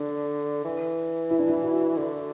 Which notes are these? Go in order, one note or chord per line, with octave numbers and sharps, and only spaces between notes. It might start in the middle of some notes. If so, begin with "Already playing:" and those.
Already playing: D3 D4
E3
E4
D4
E4
F#4
D3